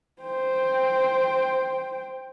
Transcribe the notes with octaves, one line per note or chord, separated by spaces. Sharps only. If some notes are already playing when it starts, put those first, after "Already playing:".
C5 G5